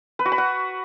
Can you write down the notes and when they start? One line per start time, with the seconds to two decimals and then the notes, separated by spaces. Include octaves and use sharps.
0.19 B4
0.25 F#4
0.32 B5
0.38 F#5